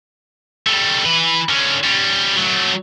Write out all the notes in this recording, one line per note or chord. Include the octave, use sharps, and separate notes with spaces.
G3 A3
E3 B4
D3 C#4
G3 C#4
F#3 A3